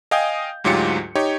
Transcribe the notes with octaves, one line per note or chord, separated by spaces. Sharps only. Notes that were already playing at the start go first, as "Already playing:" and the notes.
D#5 F5 G5 G#5 D#6 G6
D2 G#2 F#3 F4 G4 C#7
D#4 G4 C#5